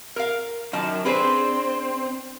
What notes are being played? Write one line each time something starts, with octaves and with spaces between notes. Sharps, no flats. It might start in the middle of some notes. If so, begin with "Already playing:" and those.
A#4 F5
F#2 D#3 A5
C4 D4 G#4 B4